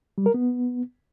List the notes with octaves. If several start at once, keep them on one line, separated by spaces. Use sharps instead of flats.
G3
A#4
B3